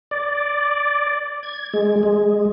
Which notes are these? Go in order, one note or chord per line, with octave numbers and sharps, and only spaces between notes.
D5
G#6
G#3
G#3